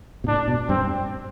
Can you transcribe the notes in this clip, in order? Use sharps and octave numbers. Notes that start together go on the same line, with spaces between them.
B2
A2 D4
B2
G2 C4